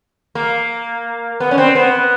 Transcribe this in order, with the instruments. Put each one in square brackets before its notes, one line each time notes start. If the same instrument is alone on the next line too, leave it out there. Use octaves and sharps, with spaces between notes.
[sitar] A#3
B3
C#4
C4
B3